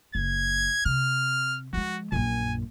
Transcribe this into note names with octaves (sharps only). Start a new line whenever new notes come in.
F#1 G#6
C3 F6
F3 G#3 F#4
A#1 F#2 G#5